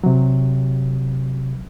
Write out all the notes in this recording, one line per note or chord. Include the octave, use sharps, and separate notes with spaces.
C3 F#3